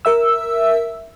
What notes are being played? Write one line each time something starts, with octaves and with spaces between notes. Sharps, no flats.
A#4 E5 E6